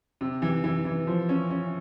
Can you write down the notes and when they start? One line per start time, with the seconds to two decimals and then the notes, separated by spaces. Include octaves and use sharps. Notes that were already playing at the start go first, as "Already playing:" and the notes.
0.21 C3
0.42 E3
0.64 E3
0.85 E3
1.07 F3
1.29 C#4
1.50 C#4